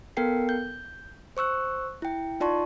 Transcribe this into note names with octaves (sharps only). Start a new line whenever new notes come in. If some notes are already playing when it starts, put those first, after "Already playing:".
B3 A4 A#4 G5 C7
G6
C5 C#6 E6 F#6
E4 G5
D#4 F4 D5 A5 C6 C#6